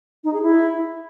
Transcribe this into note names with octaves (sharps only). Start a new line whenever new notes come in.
D#4
G#4
E4